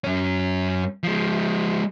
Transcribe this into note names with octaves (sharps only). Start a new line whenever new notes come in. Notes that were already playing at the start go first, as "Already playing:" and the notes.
F#2 C#4
F3 G#3